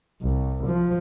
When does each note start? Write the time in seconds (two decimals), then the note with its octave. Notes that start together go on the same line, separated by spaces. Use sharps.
0.22 C2
0.67 F3